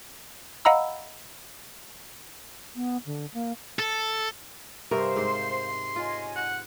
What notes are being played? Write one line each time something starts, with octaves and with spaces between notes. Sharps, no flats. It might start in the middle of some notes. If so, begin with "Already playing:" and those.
D#5 F5 F#5 A#5 B5 E6
B3
D3
A#3
A4
G2 C3 A#4 C5 F5
G#2 C6
F4 C#5 D#5 G#5
F#5